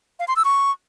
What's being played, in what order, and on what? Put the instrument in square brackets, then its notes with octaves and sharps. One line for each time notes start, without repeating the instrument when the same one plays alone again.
[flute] F5
C6
E6
C#6